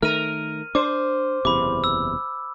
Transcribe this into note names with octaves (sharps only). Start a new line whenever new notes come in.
D#3 A3 A#4 F6 D#7
D4 C5 D6
F#1 E2 C3 B5 D6
E6